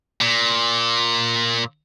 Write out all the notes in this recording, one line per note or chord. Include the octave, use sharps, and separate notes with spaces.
A#2